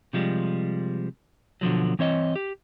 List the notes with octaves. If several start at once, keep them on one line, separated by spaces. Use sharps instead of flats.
C3 F3 G3 G#3
B2 D3 F3 F#3
E3 C4 C#5 D#5
G4